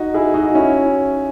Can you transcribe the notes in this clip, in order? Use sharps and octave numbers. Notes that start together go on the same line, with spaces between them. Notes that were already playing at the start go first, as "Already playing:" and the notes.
Already playing: D#4 F#4
E4 G#4
D#4 F#4
C#4 E4